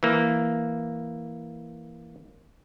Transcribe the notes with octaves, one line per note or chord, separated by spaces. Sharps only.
E3 A#3